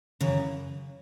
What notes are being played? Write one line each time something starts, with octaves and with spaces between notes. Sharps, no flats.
F#2 C#3 E3